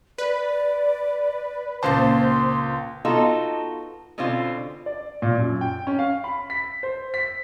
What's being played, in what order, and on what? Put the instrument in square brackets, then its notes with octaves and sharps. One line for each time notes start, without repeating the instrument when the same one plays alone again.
[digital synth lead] B4 [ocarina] D5
[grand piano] C#2 A5 [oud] A#2 A#3 C4 [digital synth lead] C5 [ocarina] C6
[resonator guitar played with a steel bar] B3 D#4 F4 F#4 A4
B2 D3 C4 C#4 F4
[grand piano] D5
A#2
F#2
G5
C#4
F5
B5
B6
C5
B6